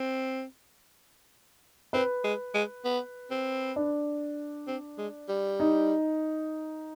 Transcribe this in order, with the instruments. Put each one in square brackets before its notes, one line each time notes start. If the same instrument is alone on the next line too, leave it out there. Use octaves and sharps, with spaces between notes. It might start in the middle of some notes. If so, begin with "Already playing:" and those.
Already playing: [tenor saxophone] C4
[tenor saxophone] C4 [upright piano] B4
[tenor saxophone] G#3
G#3
B3
C4
[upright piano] D4
[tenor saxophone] C4
G#3
G3
[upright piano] D#4